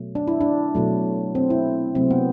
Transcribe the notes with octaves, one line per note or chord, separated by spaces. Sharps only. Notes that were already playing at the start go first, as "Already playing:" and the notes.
Already playing: B2 F#3 A3
D4
E4
D4
B2 F#3 A3
C4
E4
C3 F#3 A3 C4
B3